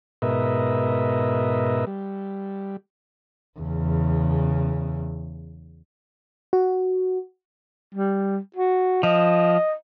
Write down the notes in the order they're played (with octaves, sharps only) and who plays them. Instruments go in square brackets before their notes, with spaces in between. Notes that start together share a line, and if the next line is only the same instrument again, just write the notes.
[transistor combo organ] G#2 B2 A#4 B4 D#5 E5
G3
[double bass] E2 C#3
[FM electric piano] F#4
[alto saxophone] G3
F#4
[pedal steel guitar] F3 [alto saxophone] D#5